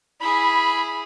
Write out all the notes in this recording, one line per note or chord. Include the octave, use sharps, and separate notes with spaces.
E4 G#4 B5